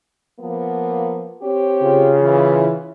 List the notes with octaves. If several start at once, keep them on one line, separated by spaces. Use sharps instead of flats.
F3 A#3 B3
C4 G4 C#5
C#3 F4
E3